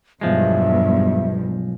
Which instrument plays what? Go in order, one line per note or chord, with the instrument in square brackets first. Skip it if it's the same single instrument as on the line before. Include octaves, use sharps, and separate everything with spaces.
[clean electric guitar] B1 F3 G#3 [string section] E2 G2 [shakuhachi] E5